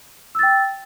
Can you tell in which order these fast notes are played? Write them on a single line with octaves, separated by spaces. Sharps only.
E6 A6 G5